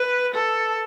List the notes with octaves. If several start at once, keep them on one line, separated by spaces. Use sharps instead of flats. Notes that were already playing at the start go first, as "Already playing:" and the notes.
Already playing: B4
A4